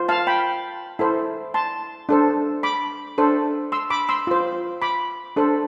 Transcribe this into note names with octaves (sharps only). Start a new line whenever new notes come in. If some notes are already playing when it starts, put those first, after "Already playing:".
Already playing: F4 C5
F5 A5
G5 B5
E4 A4 C5
A5 C6
D4 A4 C5
B5 D6
D4 A4 C5
C6 E6
B5 D6
C6 E6
F4 C5
B5 D6
D4 A4 C5